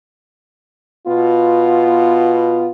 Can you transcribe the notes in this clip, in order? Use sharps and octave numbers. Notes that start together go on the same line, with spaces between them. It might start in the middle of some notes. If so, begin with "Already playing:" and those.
B2 B3 F4